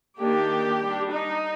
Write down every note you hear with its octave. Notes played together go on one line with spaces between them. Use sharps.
D#3 A#3 D4 G4
G3 D4
D#4